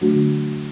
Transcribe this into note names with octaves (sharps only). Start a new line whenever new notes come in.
D3 F#3 A3 D4 F#4